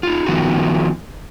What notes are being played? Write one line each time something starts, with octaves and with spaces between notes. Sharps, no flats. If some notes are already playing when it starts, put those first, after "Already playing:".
D#4 F4
D#3 F3 B3 D#4 F4 F#4